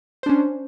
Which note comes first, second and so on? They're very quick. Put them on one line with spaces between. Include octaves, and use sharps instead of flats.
C5 D4 C#4